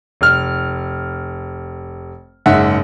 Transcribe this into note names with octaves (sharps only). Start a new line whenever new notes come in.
F1 F6
F#1 G#2 E5 F#5